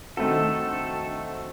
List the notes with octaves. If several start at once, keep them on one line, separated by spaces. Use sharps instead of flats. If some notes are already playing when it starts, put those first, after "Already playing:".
D#3 A3 C4 F#4 A4